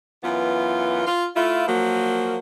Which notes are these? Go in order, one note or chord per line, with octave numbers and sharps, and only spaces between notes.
F#2 E3 B3 F4
F4
A3 E4 F4
F3 F#3 A#3